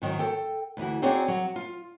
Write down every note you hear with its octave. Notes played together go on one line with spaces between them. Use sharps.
G#2 D#3 E3 F#3
A4 G5
D2 E3 F#4
C4 D#4 F#4 G#4 C#5 D5
F#3
F4